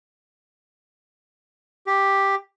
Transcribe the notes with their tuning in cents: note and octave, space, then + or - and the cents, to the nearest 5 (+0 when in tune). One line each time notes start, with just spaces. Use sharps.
G4 +5